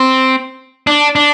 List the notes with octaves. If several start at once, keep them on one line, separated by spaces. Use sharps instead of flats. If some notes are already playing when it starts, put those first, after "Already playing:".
Already playing: C4
D4
D4